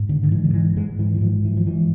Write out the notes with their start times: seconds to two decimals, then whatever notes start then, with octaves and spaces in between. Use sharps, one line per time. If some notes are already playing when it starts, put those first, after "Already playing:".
Already playing: G#2
0.09 D3
0.23 D3
0.31 G#2 E3
0.44 D3
0.54 E3
0.76 G#2 G#3
0.99 E3
1.15 E3
1.21 G#2 F3
1.45 E3
1.57 F3
1.66 G#2 E3